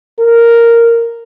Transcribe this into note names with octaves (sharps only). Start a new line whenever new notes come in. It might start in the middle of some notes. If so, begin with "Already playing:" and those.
A#4